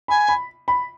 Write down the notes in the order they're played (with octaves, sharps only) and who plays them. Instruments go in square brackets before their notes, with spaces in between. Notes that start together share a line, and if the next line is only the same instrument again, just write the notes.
[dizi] G#5 [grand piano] B5
[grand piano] B5
B5